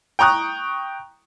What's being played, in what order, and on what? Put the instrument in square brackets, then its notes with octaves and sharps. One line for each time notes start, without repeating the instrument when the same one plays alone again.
[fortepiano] G5 A#5 C#6 D#6 F#6